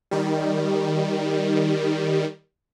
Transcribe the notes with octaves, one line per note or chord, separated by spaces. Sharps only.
D#3 G3